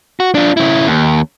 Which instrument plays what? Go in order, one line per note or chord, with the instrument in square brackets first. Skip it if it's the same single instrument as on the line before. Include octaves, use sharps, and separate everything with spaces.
[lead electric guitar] F#4
D4 F4
C#3 E4
D#2